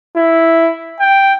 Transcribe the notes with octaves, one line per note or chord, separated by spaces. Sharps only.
E4
G5